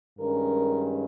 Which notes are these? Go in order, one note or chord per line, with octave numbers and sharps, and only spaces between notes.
G2 D#3 G#3 C#4 A#4